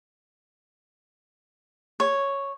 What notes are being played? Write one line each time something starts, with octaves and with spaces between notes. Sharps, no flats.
C#5